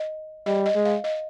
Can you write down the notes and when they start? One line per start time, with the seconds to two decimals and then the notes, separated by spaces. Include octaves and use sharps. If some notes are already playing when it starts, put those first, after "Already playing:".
Already playing: D#5
0.46 G3 D#5
0.66 D#5
0.75 G#3
0.85 F5
1.04 D#5